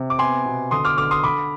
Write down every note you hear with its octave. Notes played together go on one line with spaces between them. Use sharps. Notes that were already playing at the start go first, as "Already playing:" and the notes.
Already playing: C3
D6
B3 G#5 C6
B2
D3 C6 D#6
D6 F6
D3 D6 F6
C6 D#6
D3 B5 D6